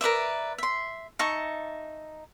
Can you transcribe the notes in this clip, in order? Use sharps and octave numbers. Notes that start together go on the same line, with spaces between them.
A#4 B4 D5 E5
E5 C6
D#4 E5 A5 C#6